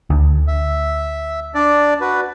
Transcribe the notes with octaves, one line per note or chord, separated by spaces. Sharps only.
D2
E5
D4 D5
F#4 B4